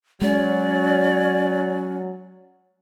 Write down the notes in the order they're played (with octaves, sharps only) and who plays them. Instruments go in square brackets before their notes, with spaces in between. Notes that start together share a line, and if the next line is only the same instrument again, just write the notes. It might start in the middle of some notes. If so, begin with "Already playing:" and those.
[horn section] F#3 [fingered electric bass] G#3 [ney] C#4 [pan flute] D5